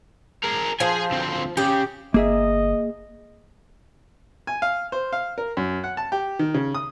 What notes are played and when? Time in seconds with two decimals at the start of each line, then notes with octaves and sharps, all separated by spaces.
0.44 G#4 A#4
0.80 F3 G#4 G#5
1.11 D2 C4
1.57 C#3 G4
2.14 G1 A#3 G#4 D#5 E5
4.47 G#5
4.62 F5
4.92 C5
5.13 F5
5.38 A#4
5.57 F#2
5.84 F#5
5.97 A5
6.12 G4
6.39 D#3
6.54 C#3
6.74 D#6